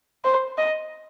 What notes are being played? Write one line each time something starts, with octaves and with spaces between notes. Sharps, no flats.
C5
D#5